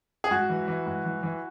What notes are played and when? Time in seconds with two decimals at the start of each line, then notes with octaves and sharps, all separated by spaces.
0.24 G#4
0.31 G#2 F#4
0.50 E3
0.68 E3
0.86 G#2
1.05 E3
1.23 E3